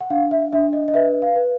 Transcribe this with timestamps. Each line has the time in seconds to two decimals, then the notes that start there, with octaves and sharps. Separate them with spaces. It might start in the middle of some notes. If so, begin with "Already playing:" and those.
0.01 F#5
0.10 D4 F5
0.31 E5
0.53 D4 E5
0.73 D#5
0.88 D#5
0.94 B4 E5
1.22 F5
1.36 B4